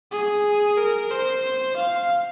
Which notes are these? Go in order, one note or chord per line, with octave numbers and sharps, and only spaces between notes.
G#4
A#4
C5
F5